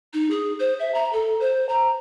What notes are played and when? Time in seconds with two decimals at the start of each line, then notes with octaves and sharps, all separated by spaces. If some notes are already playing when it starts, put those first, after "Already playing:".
0.13 D#4
0.30 G#4
0.60 C5
0.80 E5
0.94 A#5
1.13 A4
1.40 C5
1.69 A#5